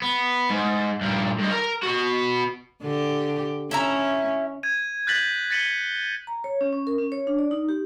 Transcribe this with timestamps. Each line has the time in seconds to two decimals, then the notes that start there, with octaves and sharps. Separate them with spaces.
0.02 B3
0.50 G#2
1.01 G2 A#2
1.39 G2 D#4
1.51 A#4 A#5
1.83 B3 F#4
2.83 D3 G4
3.71 C#4 E4 E5 A#5
4.63 G#6 D#7
5.07 F#6 G6 A6 B6 F#7
5.50 A6 B6 C#7 D#7 F#7 G7
6.27 A#5
6.44 C#5
6.61 C#4
6.73 C#4
6.87 A#4
6.98 C#4
7.12 C#5
7.27 D4
7.39 D5
7.51 D#4
7.69 G4